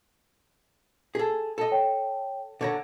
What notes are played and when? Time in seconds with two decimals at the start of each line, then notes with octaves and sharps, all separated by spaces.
1.15 G#4 A4
1.58 A4 D#5
1.71 C#5 G5
2.61 D3 C#5 A#5